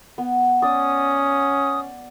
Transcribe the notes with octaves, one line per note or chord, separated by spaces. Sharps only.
B3
C#4 D5 D#6